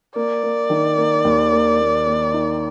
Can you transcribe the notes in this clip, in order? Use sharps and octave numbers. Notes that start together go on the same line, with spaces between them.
A#3 D5
A#3
D#3
A#3
D#2
A#3
A#3
A#3
D#4